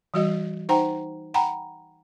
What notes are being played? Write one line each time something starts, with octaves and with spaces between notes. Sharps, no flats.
E3 G3 F#4 D#5
D#4 C5 F#5 G5 A#5
F#5 G5 A#5 B5